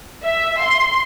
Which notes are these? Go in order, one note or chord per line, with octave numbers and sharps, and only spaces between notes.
E5
C6